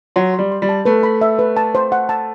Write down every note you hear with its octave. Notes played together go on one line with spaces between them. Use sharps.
F#3 C6
C6
G3
C6
G3
A5
A3 B4
B5
E5
B4
A5
C5
F#5
A5